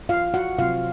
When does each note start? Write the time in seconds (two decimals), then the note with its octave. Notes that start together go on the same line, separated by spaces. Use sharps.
0.09 F4 F5
0.34 F#4 F#5
0.58 C3 F#3 C4 F4 F5